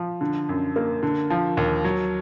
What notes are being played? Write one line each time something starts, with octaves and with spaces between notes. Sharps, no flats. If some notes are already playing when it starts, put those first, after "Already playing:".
Already playing: F3
D3
F#2
A#3
D3
F3
D#2
F#3